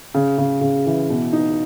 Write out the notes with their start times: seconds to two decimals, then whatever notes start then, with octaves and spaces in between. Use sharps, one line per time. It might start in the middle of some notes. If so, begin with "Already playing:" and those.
0.14 C#3
0.38 C#3
0.61 C#3
0.86 E3
1.10 B2
1.33 D#4